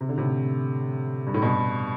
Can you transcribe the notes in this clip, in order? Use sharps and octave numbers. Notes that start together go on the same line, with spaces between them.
C3
D3
A2 C3
G2
A2
G2 B2